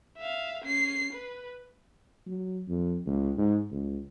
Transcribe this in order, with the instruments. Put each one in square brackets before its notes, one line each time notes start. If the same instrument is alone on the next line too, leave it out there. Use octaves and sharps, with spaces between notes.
[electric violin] E5 F5
C#4 C7
B4
[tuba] F#3
F2
C#2
G#2
C#2